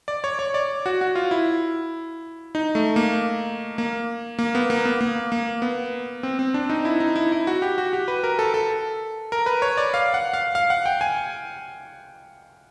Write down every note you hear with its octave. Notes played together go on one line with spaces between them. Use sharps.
D5
C#5
C#5
D5
F#4
F#4
F4
E4
D#4
A3
A#3
A#3
A#3
B3
A#3
B3
A#3
A#3
B3
C4
C4
D4
D#4
E4
D#4
E4
E4
F#4
G4
F#4
G4
B4
A#4
A4
A4
A#4
B4
C#5
D5
F5
F#5
F5
F5
F#5
G5
G#5